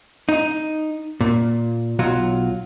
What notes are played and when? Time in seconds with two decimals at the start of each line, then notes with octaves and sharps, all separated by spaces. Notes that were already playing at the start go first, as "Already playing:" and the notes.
0.29 D#4
1.21 A#2
1.99 B1 F#3 F4